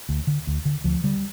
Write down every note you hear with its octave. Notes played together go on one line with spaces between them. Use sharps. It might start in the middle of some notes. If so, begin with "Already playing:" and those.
D2
D3
D2
D3
D2 F3
D3 G3